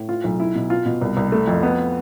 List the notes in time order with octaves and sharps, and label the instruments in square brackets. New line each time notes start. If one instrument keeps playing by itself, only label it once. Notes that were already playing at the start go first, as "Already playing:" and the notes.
Already playing: [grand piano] A2
F4
B1
E4
B2
F4
B2
C2
C2
A3
F2
B3